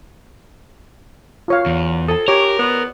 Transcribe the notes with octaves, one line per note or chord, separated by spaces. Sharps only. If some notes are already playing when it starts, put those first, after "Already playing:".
F4 C#5 F5
E2
A4 A5 D#6
G4 A#4 C#5
B3